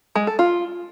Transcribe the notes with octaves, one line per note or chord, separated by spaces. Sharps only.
G#3
A4
F4